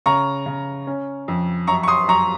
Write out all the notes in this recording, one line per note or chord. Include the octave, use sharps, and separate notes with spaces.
C#3 A#5 C#6
C#3
C#4
F2
F#2 A#5 C#6
C#6
C6 D#6
F#2 A#5 C#6